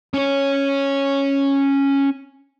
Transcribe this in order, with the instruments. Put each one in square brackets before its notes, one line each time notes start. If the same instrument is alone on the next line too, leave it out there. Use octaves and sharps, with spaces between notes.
[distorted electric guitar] C#4 C#5